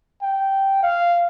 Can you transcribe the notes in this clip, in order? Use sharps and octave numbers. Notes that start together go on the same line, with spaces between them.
G5
F5